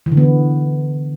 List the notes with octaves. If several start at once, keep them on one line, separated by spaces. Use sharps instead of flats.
E3
D3
B3
E3